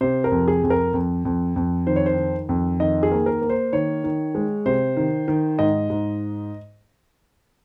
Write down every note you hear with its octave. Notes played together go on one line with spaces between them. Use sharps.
C3 C5
A#4
F2
G#4
F2
A#4
F2
F2
F2
D#3 C5
C#5
C5
D#3
F2
D#3 D#5
G#4
A#3
A#4
A#3
C5
D#3 C#5
D#3
G#3
C3 C5
D#3
D#3
G#2 D#5
G#2